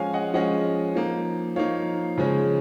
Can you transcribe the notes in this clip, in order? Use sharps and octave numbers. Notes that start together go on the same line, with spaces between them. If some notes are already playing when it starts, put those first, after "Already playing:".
Already playing: F3 G#3 C#4 F5 G#5
D#5 F#5
F3 G#3 C#4 D#5 F#5
F3 A#3 D#4
F3 A#3 D#4 C#5 F5
C#3 F3 G#3 C#4